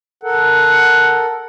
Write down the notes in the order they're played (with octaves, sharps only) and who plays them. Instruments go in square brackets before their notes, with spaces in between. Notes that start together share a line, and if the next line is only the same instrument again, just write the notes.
[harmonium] A4 A#4 [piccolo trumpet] F#5